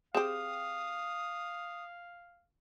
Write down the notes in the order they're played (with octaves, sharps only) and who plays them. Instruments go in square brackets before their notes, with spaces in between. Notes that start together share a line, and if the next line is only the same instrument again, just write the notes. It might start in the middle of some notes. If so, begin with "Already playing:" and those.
[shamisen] C4 G4 [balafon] G#4 [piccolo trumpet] F5 [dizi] D#6